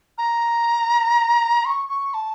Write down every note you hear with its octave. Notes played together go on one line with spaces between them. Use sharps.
A#5
C#6
C#6
A5